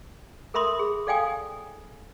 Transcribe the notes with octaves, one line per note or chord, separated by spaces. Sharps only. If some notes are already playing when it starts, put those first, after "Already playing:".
A4 A#4 E5 B5 C6 D#6
G#4
A4 D5 F5 G5 G#5 D#6